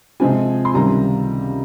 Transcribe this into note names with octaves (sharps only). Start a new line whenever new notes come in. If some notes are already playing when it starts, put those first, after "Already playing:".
C3 F3 G#3 C4 F4 G#5
C6
C#2 C3 D#3 G3 A#5